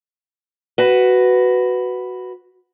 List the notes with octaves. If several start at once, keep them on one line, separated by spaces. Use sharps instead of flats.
F#4 B4